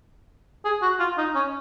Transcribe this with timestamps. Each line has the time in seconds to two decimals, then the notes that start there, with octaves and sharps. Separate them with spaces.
0.65 G#4
0.82 F#4
1.00 F4
1.18 D#4
1.35 C#4